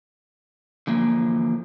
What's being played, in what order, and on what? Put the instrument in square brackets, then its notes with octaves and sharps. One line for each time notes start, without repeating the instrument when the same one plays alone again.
[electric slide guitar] D3 E3 F3 A#3